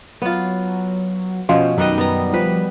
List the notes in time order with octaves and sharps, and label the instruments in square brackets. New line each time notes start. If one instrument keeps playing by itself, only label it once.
[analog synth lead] F#3 [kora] B3 F4
[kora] B2 [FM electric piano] F3 F4 C5 [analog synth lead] C#4
[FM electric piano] F#2 D#4 [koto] D#3 G3 D#5 [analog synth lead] F#6
[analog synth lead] G3 [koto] B3 A#5
[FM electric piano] F3 [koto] B4